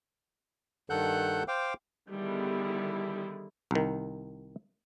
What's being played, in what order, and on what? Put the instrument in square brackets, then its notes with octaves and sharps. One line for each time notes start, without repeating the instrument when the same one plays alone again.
[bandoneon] G2 D#3 A4 F#5 F#6 G6
C5 F5 G5 D6
[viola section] D3 D#3 G3 B3 E4 G#4
[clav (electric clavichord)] C2 D#3